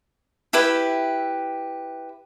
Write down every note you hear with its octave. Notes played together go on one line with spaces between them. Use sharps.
E4 G4 B4 E5